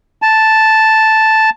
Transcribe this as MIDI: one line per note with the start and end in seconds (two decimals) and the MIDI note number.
0.22 1.50 81